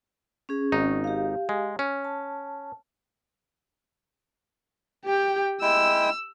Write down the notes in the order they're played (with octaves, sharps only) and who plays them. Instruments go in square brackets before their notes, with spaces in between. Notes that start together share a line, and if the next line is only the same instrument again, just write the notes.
[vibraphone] C#4 G#4
[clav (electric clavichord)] G#1 D#4 [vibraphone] C#4
[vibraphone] G4 F5
[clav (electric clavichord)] G#3
C#4
[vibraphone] A5
[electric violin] G4 G5
[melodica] G#3 E4 G5 [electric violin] E6